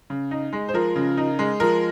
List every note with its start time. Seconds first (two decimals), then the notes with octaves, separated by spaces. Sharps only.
0.10 C#3
0.31 D#4
0.53 G#3
0.69 C5
0.74 F3 A#4
0.96 C#3
1.17 D#4
1.39 G#3
1.60 F3 A#4